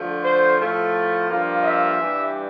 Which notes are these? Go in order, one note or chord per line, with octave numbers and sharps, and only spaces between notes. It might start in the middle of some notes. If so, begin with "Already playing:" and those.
Already playing: D3 F3 A3
C5
A2 F3 A3
G2 F3 A#3
E5
G2 E3 G3